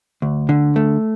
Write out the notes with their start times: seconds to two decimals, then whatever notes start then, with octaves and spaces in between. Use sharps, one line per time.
0.22 D2
0.49 D3
0.76 A3